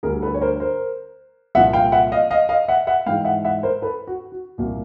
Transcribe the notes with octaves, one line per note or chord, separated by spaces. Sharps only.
D2 D3 G3 G#4 A#4
A4 B4
C#5
A#4 C5
A#4 C5
C2 A#2 F3 E5 F#5
F5 G5
E5 F#5
D#5 F5
D#5 F5
D#5 F5
E5 F#5
E5 F#5
G#2 E3 G#3 F5 G5
E5 F#5
E5 F#5
A#4 C5
A4 B4
F#4
F#4
C2 A#2 F3 A#3 F#4